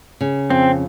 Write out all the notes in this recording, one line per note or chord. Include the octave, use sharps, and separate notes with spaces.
C#3
F2 C4